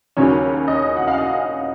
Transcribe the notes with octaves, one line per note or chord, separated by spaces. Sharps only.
D#2 C#3 F#3 C#4 C#5
D#5
F#5
F5
D#5
F5